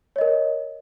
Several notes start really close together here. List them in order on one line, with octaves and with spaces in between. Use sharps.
C#5 D#5 A#4